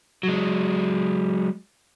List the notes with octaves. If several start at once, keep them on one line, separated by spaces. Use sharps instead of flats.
F#3 G#3